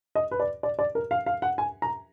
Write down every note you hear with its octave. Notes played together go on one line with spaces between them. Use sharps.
D#5
B4
D5
D5
D5
A#4
F5
F5
F#5
G#5
A#5